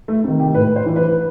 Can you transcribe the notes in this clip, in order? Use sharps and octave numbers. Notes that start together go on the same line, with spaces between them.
A3
C3 D#3
G4
A2 B4
C5
E3
B4